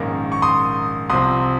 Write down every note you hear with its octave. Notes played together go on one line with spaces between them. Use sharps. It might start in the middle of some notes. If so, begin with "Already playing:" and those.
Already playing: A#1 G#2 D#3 A#3 C#4
C#6
C6 D#6
C2 C3 F3 C4 C6 D#6